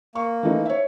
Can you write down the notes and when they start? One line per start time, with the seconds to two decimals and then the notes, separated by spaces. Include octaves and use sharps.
0.15 A#3 C#6
0.43 E3 A3 D#4
0.65 C#5 E5